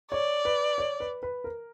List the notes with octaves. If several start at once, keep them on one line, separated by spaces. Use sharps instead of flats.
C#5 D5
B4
C#5
B4
B4
A#4